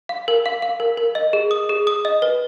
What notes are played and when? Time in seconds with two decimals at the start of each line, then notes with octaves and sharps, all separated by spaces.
0.09 F5
0.28 A#4
0.46 F5
0.62 F5
0.80 A#4
0.97 A#4
1.15 D#5
1.33 G#4
1.51 D#6
1.69 G#4
1.87 D#6
2.05 D#5
2.22 B4